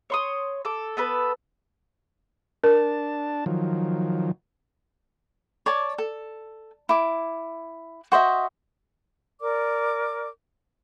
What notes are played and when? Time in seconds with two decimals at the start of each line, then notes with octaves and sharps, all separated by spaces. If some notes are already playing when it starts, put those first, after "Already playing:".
0.10 C#5 C6 D#6
0.65 A4 D6
0.97 B3 A4 B4
2.64 D4 A#4 A5
3.46 D#3 F3 F#3
5.66 C#5 D5 A5
5.98 A4
6.89 E4 D6
8.12 F#4 C5 D#5 E5
9.41 A#4 D5 D6